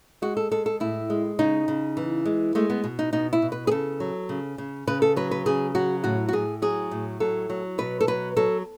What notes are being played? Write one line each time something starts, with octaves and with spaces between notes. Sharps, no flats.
G#3 F#4
A4
G#3 A4
A4
A2 E4
G#3
C#3 D#4
C#3
E3
G#3
G#3 A3
B3
B2
D#4
B2 D#4
E4
B2
B4
G#4
C#3 A4
F#3
C#3
C#3
C#3 B4
A4
F#3 B4
B4
C#3 G#4
F#3 F#4
A2 F#4
F#4
A2 G#4
F#3 G#4
A2
F#3 A4
F#3
B2 B4
A4
F#3 B4
F#3 A4